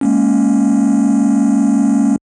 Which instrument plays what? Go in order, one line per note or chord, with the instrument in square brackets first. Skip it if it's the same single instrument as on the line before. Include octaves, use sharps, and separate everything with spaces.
[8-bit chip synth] G#3 A#3 C#4